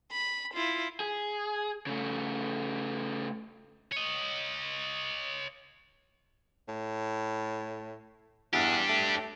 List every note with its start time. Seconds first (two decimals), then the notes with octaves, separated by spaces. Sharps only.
0.12 B5
0.54 E4 F4
1.00 G#4
1.86 C#3 A3
3.92 C#5 D#5
6.69 A2
8.53 E2 D4 G4
8.89 A3